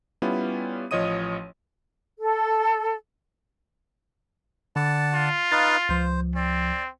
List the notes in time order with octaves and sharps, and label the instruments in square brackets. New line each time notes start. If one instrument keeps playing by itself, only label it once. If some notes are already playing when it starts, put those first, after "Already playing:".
[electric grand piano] G3 B3 C#4 E4 F4
A1 F3 C#5 D#5 D#6 D#7
[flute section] A4
[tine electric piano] D3 [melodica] D5 F#5 A5
[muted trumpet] F4
[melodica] D#4 B4 F5 [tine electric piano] A6
[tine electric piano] C#2 F3 [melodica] C5
[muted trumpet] C4 [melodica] D5